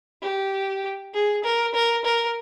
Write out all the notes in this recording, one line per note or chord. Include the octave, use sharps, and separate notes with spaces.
G4
G#4
A#4
A#4
A#4